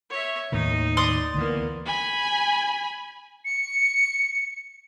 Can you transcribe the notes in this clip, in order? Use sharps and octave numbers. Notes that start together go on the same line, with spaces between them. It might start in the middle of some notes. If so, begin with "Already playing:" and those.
C#5 E5
D#2 A2 D#3 D#4
D5 C6 D#6
D2 E3 A#3 B3
G#5 B5
C#7